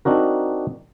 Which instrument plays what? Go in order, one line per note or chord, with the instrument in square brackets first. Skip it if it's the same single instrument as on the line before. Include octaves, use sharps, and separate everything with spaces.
[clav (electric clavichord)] C4 D4 D#4 F#4 A#4